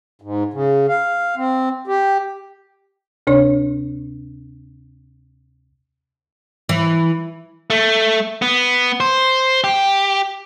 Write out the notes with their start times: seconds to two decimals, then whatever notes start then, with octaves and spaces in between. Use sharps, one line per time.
0.22 G#2
0.53 C#3
0.88 F5
1.36 C4
1.87 G4
3.27 D2 C3 D4 C#5
6.69 E3
7.70 A3
8.42 B3
9.00 C5
9.64 G4